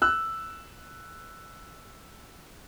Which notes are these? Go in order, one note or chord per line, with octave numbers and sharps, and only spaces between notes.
E6 F#6